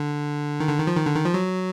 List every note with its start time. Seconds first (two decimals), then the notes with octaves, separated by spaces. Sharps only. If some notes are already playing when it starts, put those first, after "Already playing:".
Already playing: D3
0.60 D#3
0.69 D3
0.78 D#3
0.87 F3
0.97 D#3
1.07 D3
1.16 D#3
1.25 F3
1.34 F#3